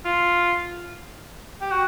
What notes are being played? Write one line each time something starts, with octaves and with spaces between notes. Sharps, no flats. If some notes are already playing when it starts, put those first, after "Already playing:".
F4
G4
F#4